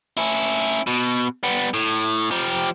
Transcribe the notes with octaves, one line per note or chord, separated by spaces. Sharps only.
C#4 E4
B2
G3 B3
A2
F3 G4